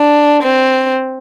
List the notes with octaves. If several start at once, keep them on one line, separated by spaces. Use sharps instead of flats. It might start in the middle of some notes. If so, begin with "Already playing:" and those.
Already playing: D4
C4